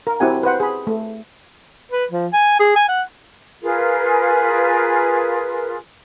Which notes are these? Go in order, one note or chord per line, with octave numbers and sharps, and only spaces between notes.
A#4
C4 E4 F#4 G4 F#5 G#5
B4 C5 F#5
G#4 B5
A3
B4
F3
G#5
G#4
G#5
F#5
F4 G#4 A#4 B4